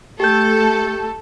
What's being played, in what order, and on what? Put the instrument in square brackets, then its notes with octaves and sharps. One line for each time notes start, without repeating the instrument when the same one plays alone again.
[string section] A3 A4 [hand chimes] G4 G6